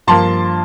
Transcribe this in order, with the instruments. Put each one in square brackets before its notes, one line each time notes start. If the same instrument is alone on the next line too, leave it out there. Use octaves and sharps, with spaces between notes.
[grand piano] G2 F3 A#3 A5 C6